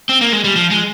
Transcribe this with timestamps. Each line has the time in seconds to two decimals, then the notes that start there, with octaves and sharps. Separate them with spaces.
0.09 C4
0.21 A#3
0.33 G#3
0.44 G3
0.56 F3
0.71 G#3